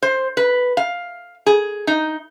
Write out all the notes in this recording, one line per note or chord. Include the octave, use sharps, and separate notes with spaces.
C5
B4
F5
G#4
D#4